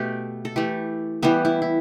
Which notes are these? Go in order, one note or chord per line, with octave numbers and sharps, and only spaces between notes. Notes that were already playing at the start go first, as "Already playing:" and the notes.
Already playing: B2 A3 G4
A4
E3 A3 G4
E3 G3 B3 G4
E4
E4